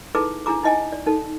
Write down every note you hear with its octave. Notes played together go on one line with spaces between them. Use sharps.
D#4 E4 G#4 A4 B4 D6
D4 E4 G#4 A#5 D6
D#4 E4 D#5 G5 G#5
D5
D#4 A4